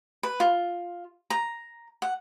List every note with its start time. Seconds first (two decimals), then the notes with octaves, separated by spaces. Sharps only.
0.23 B4
0.40 F4
1.30 A#5
2.02 F#5